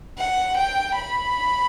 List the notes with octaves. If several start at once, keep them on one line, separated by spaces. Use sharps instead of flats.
F#5
G5
B5